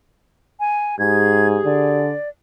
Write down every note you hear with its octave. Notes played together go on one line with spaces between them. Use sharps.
G#5
G#2 G4 G#4 G#6
D3 D5